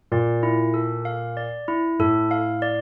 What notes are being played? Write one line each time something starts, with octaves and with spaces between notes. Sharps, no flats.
A#2 D5
E4
A4
F5
D5
E4
A2 A4
F5
D5